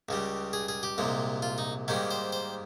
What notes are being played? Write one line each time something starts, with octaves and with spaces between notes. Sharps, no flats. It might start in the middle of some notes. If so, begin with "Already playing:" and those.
C#2 C#3 G3
G#4
G#4
G4
C2 A#2 G#3
F4
D#4
G#2 D#3 G3 A#3 C#4
C5
C5